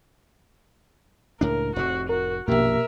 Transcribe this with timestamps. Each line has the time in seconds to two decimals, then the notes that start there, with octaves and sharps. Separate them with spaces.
1.41 C#2 A2 D4 A#4
1.76 F1 A2 C3 F#4
2.09 F#4 A#4
2.48 A#1 F#2 B2 A#3 G4 A#4 E5